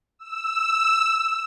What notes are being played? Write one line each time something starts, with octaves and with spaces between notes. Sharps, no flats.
E6